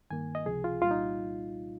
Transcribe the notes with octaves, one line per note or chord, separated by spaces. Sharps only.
G2 D#3 A#3 G#5
D#5
C#2 C3 F3 G#4
F4
C2 A#2 G3 F4
D#4